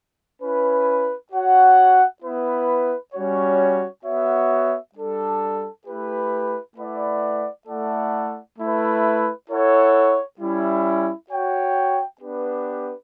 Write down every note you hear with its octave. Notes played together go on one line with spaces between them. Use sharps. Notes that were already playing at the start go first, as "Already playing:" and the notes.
C#4 E4 B4
F#4 C#5 F#5
B3 E4 B4
G3 C#4 F#4 C#5
B3 F#4 C#5 E5
G3 D4 A4
A3 E4 G4 B4
A3 E4 B4 D5 F#5
A3 E4 A4 D5 F#5
A3 E4 B4
E4 A4 C#5 F#5
G3 C#4 E4
F#4 C#5 G5
B3 D4 G4 B4